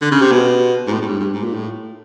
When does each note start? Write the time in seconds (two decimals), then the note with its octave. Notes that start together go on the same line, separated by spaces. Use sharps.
0.01 D3
0.11 C#3
0.22 C3
0.32 B2
0.87 G#2
0.93 A2
1.02 G#2
1.06 G2
1.20 G2
1.34 G#2
1.44 A#2
1.54 A2